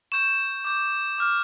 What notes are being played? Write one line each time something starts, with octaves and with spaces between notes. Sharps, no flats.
C#6 G6 E7
D6 G6
D6 F6